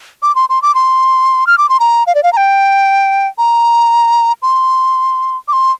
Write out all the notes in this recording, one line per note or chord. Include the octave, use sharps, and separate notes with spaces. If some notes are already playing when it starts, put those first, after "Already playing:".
D6
C6
C6
D6
C6
F6
D6
C6
A#5
F5
D5
F5
A#5
G5
A#5
C6
D6
C6